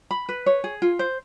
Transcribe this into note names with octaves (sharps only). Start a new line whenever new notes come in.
B5
B4
C#5
G#4
F4
C5